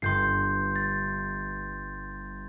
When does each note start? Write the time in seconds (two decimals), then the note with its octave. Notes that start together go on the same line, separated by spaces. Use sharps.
0.02 G1 C6 G6 C7
0.76 A6